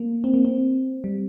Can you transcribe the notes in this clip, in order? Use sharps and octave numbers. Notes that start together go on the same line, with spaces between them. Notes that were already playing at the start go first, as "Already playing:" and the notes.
Already playing: A#3
C4
A#3
C4
G3